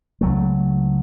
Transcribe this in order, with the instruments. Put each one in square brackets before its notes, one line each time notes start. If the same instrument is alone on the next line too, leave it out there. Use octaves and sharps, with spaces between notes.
[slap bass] C#2 F#3 A3